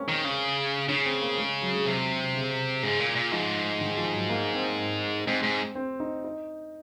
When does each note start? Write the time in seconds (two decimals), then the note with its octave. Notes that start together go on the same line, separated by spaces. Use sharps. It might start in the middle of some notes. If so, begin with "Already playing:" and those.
Already playing: G#3 A#3 C4 C#4
0.08 D#3
0.25 C#3
0.89 C#3 C#4
1.05 C4
1.22 A#3
1.38 G#3
1.62 F#3
1.74 G#3
1.86 C3 F#3
2.35 C#3
2.83 G#2 C#3
3.00 A#2
3.15 A#2
3.32 G#2 F3
3.81 D#3
3.97 F3
4.13 F#3
4.29 A#3
4.54 C4
5.27 G#2 C4
5.43 G#2
5.75 C4
6.00 D#4
6.24 D#4